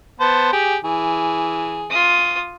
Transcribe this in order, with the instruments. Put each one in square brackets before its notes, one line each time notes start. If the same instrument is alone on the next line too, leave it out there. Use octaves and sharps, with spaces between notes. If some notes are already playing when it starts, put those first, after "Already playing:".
[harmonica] B3 C5 A5
G4 G#4
E3 G#4
[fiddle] F4 D#6